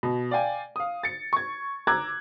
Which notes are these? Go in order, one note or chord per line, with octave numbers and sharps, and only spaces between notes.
B2
D5 F5 G5 G#5
F5 D#6
A6 C#7
C#6 G#6
A#5 D6 E6 F#6 G#6